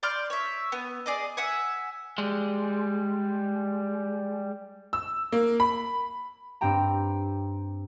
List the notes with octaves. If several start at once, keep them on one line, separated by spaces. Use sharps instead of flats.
D5 C6 F6 G6
C#5 E5
B3
G#4 D5 D#5
E5 F#5 G#5
G3 G#3
E6
A#3
B5
G2 C4 G4 G5 A#5